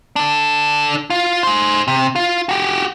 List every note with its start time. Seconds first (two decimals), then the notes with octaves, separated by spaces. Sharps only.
0.16 D4 A4
1.10 F4
1.43 G#4 C5
1.88 C3
2.16 F4
2.49 F#4 G4